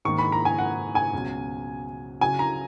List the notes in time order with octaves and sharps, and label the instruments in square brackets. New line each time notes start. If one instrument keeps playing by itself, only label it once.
[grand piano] G#2 D#3 A#3 [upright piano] C#6
[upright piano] B5
A#5
G#5
F#5
G#5
[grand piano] C#2 B2 F#3
[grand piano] C#3 F#3 C#4 [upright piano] G#5
[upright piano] A#5